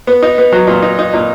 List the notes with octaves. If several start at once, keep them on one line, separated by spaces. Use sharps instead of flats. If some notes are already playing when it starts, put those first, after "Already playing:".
B3
D#4
B3
F#3
A#2
D#4
D#4
A#2